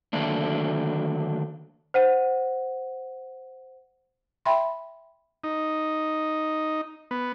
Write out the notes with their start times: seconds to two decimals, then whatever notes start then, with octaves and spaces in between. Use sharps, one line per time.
0.13 D3 D#3 F#3 A3 A#3 D4
1.94 C5 F#5 D#7
4.45 E5 G5 B5 C6
5.44 D#4
7.11 B3